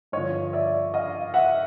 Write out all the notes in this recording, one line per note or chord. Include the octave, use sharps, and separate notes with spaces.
G2 D3 F3 C#5 D#5
D5 E5
D#5 F5
E5 F#5